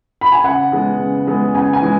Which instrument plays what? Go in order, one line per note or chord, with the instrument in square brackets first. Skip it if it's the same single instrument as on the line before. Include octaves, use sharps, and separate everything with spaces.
[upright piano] B5
G#5
[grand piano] C#3 [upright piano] F#5
[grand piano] E3 G#3 B3 G#4
C#3
E3 G#3 B3 G#4
[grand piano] C#3 [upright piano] G#5
[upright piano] G#5
[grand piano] E3 G#3 B3